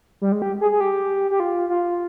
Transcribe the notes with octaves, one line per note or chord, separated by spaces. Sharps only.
G3
G#3
G4
G#4
G#4
G4
G4
F4
F4